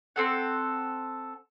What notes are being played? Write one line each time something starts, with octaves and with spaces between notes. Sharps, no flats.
C4 A4 F#5